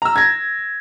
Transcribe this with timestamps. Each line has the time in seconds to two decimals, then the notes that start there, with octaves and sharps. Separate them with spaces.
0.02 A#5 E6
0.16 G#6 A#6